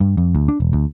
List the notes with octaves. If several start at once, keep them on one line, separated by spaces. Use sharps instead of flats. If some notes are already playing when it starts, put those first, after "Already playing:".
G2
F2
D2
D4
E1
D2